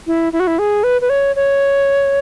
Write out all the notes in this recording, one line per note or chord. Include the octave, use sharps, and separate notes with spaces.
E4
E4
F#4
E4
G#4
B4
B4
C#5
C#5